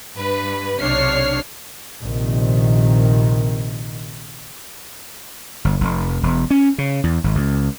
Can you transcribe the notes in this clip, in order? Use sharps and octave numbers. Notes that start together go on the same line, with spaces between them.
G2 B4
B1 C3 D4 C#5 F6 C7
A#1 C3 D#3
G1
F1
E1
C#4
C#3
E2
G#1
C#2